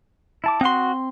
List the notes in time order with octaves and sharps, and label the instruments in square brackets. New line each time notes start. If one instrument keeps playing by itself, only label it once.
[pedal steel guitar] E4 A5 D6
[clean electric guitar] C4 C6 [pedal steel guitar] F#4 F#5 D#6